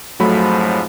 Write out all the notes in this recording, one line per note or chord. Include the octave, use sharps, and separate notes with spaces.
F2 G#2 F3 F#3 A3 B5